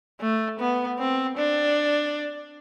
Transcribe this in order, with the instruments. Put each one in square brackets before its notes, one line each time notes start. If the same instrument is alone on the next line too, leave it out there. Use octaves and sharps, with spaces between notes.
[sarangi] A3
B3
C4
D4